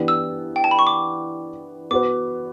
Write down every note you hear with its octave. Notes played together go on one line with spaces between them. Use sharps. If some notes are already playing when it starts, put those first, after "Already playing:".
Already playing: E3 B3 D4 G4
E6
G5
A5
B5
C#6
D6
B3 F#4 B4 D6